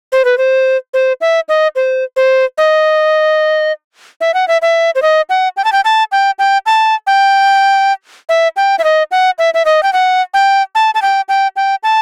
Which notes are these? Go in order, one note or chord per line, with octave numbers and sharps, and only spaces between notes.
C5
B4
C5
C5
E5
D#5
C5
C5
D#5
E5
F#5
E5
E5
C5
D#5
F#5
G5
A5
G5
A5
G5
G5
A5
G5
E5
G5
E5
D#5
F#5
E5
E5
D#5
G5
F#5
G5
A5
A5
G5
G5
G5
A5